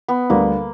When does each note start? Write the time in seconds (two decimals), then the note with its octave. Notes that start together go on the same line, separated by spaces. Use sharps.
0.08 B3
0.30 D2 D3 G3 A#3